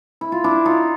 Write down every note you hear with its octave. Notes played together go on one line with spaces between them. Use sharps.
E4
F4
D4 E4
D#4 F4